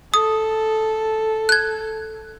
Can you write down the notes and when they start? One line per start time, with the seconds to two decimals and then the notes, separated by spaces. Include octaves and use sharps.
0.14 A4 D#6
1.49 F#6 G#6